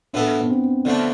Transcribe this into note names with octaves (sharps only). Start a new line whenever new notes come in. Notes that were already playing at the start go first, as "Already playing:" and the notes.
A2 E3 B3 D4 E4 A4
B3
C4
D3 F3 A3 B3 D4